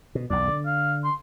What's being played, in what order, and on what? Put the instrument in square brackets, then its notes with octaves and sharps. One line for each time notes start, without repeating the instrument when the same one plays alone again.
[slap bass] B2
[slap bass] B1 E2 [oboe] D5
[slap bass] D3
[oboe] F5
C6